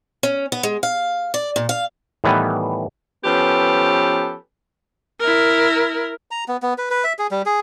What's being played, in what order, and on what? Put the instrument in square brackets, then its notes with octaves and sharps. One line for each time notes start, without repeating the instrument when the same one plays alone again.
[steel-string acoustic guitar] C#4
B3
G#3
F5
D5
A#2
F5
[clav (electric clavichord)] A2 D#3 E3 G3 B3
[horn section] F3 B3 C#4 G4 A4 B4
[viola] E4 A#4
[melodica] A#5
B3
B3
B4
B4
E5
G#4
G3
G#4